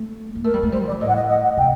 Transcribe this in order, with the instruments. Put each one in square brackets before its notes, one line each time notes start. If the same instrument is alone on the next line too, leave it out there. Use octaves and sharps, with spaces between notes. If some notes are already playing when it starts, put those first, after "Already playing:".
Already playing: [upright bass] A3
A#3
[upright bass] A3 [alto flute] A#4
[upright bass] G3
A3
[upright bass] G3 [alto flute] C5
[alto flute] D5
[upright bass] A#2
[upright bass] A2 [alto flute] D#5
[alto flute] F#5
D#5
D#5
F#5
[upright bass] C3 [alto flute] G5